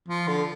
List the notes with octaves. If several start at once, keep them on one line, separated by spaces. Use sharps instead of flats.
F3
D3